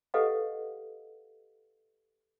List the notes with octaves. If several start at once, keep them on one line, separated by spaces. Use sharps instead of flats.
G4 A4 B4 D#5 F5 F#5